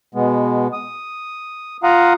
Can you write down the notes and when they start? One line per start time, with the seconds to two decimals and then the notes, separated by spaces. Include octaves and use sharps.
0.15 B2 G#3 B3
0.73 D#6
1.83 F4 F5 F#5 A#5 D#6